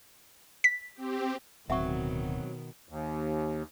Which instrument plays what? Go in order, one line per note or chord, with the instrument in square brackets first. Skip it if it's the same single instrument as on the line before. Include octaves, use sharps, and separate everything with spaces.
[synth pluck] B6
[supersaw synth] C4 G4
[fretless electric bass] D1 [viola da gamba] B2 D#3 [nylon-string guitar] F#3 C4 [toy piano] E5 F#5 C#6
[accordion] D#2